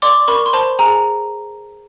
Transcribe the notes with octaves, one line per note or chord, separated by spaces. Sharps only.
D5 C6 D6
A#4 B5 C#6
C6
C5 A5 B5
G#4 G#5 A#5